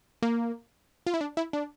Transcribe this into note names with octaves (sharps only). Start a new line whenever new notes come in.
A#3
F4
E4
D4
E4
D4